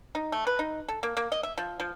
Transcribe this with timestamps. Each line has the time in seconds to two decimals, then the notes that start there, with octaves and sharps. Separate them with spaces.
0.15 D#4
0.32 A3
0.47 B4
0.59 D#4
0.88 A4
1.03 A#3
1.17 A#3
1.32 D#5
1.43 E5
1.58 F3
1.80 F3